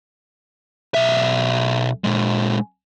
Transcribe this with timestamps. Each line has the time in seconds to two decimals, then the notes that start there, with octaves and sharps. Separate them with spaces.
0.94 B1 E5
2.04 A#2 G#3